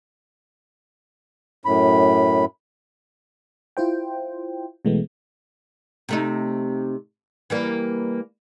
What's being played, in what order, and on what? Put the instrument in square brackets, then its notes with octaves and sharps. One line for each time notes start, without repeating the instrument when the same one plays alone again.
[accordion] F#2 A2 B5
[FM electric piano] E4 F4 C5 G5
B2 E3 G#3 A3 B3
[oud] C3 A3 D#4
E3 G3 A#3